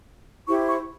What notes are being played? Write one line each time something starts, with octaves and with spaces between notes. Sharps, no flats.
E4 G4 C5 C#6
C#6